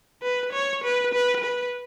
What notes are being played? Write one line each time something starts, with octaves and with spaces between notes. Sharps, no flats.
B4
C#5
B4
B4
B4